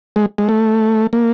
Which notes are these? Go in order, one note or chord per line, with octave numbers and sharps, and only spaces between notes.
G#3
G#3
A3
A#3